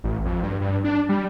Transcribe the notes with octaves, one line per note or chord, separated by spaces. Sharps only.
A1
F2
G2
G2
D4
G3